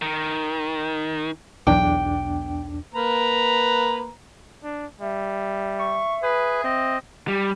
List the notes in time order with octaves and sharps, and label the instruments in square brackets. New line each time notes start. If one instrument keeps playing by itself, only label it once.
[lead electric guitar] D#3
[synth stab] B1 [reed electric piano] E2 D4 D6 [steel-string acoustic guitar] G5
[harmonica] A#3 B4 A#5
[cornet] D4
[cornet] G3 [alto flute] E5
[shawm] C#6
[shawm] G#4 [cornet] B4
[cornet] C4 [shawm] D#5
[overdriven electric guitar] G3